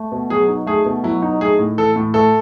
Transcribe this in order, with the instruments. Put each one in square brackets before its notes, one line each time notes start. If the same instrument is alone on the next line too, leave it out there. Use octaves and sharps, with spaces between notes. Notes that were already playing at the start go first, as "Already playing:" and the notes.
Already playing: [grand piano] A3
B2
[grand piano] F#3 [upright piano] G#4
[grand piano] D#4
[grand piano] A3 [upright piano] G#4
[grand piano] B2
[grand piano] F#3 [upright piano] E4
[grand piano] D#4
[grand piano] A3 [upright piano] G#4
[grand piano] A2
[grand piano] E3 [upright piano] A4
[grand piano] A2
[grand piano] A3 [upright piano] A4